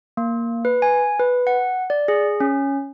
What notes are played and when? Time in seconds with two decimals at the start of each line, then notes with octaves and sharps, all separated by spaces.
0.17 A#3
0.65 B4
0.82 G#5
1.20 B4
1.47 F#5
1.90 D5
2.08 G#4
2.40 C#4